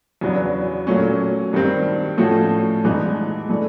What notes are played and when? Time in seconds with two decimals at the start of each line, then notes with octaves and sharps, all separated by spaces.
0.21 E2 C#3 F#3 B3 D4
0.87 A#2 F#3 A3 C#4
1.53 G2 D#3 G3 C4
2.18 A2 F3 A3 C#4 F#4
2.84 G2 E3 G#3 B3 D#4
3.49 E3 A3 D4